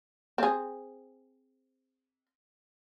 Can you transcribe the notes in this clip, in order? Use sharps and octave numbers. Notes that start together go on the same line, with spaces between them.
C4 G#4